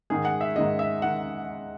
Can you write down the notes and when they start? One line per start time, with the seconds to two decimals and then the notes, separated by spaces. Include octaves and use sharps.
0.10 G#2 D#3 G#3 G#4
0.25 F#5
0.41 E5
0.56 G#2 D#3 G#3 D#5
0.79 E5
1.02 D#3 F#5